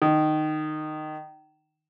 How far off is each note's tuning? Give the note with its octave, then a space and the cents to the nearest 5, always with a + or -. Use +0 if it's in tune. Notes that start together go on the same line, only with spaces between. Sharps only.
D#3 -15